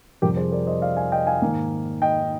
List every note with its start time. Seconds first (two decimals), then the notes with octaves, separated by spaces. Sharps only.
0.22 F2 C3 G3 G4 A#4
0.37 G#4 C5
0.52 A#4 D5
0.67 C5 D#5
0.82 D5 F5
0.97 F5 G#5
1.12 D#5 G5
1.27 F5 G#5
1.42 G#2 D#3 A#3
2.02 D#5 G5